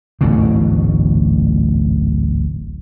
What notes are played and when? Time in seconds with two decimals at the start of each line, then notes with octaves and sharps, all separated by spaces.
0.21 D1 A1 G#2 B2